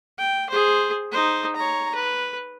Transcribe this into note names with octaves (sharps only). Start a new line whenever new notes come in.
G5
G#4 C5
D#4 C5
C#5 A#5
B4